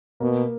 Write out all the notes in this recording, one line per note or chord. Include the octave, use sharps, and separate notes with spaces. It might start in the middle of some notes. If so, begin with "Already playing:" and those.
B2 A#3